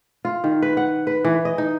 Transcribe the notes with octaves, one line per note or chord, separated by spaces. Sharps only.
F4
D#3
B4
F#5
B4
E3
D#5
D#4